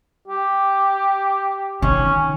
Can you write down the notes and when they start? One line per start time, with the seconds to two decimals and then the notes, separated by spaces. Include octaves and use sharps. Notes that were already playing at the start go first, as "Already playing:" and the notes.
0.28 G4
1.82 D#3 C#4